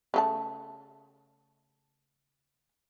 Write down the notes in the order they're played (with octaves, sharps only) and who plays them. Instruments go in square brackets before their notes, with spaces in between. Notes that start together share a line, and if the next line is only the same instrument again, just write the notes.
[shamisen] C#3 A3 A5